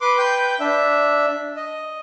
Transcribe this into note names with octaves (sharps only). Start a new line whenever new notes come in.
B4 C6 D6
B4 G5 G6
D4 E5
D#5